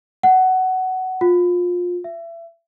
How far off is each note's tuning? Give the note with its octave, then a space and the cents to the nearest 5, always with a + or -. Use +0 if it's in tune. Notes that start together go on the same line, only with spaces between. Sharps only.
F#5 +15
F4 +25
E5 +30